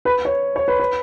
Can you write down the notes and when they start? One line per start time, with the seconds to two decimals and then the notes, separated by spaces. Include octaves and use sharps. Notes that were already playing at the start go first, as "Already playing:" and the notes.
0.05 B4
0.25 C#5
0.56 C#5
0.68 B4
0.80 B4